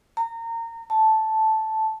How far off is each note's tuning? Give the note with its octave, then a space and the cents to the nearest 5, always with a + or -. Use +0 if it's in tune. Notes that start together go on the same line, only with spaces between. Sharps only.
A#5 -25
A5 -5